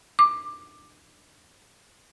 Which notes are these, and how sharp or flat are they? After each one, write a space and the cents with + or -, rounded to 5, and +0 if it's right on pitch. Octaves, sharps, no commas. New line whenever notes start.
D6 +15